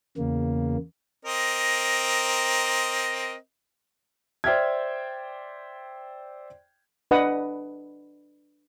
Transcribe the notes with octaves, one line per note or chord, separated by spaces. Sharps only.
E2 C#3 A#3
C4 A#4 D#5
C5 D5 E5 G5 F6 G#6
D4 B4 D#5 F#5 D#6